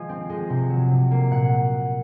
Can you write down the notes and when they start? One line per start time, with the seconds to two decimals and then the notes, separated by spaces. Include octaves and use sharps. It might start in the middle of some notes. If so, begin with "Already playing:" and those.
Already playing: F3 G#3 D#5 G#5
0.09 C4
0.30 G#3
0.50 C3
0.70 F#3
0.91 C3
1.11 A#3
1.31 A#2 F#5